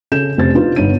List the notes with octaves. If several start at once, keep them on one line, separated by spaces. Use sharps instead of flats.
C#3 A4 G6 E7
F1 C5 A6
D4 D#4 F4 B4
G1 B3 D#4 C#5 D#7